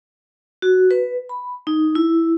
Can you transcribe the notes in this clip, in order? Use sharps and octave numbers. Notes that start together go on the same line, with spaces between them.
F#4
B4
B5
D#4
E4